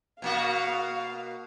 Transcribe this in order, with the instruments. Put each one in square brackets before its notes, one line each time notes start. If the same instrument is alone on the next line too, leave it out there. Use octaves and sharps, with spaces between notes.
[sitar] B2 A#3 F#4 [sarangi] F5